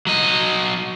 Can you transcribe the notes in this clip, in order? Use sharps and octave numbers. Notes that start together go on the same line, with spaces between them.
F#3 D#5